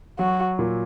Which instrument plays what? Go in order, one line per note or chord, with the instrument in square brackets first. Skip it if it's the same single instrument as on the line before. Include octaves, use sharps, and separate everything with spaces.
[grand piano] F#3 [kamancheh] F#4
[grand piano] A#2